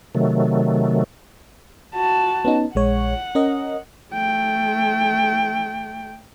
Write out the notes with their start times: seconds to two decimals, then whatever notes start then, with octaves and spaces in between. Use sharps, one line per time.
0.15 C3 D#3 F#3 A3
1.95 F#4 A5
2.45 B3 C#4 D#4
2.75 A#1 G#3 C#5 F#5
3.35 C#4 A#4 D#5
4.13 A3 G5